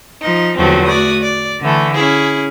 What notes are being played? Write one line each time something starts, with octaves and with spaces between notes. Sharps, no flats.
F3 D#4
E2 D3 F3 F#3 A3 C4
A3 F#4 D5 D#6
D5
D3 E3 A3
C#4 E4 G#4